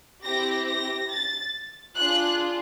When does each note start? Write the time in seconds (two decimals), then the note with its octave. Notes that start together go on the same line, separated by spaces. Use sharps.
0.24 C4 E4 G4 A#6
0.68 A#6
1.10 A6
1.97 D4 F4 G#4 F#6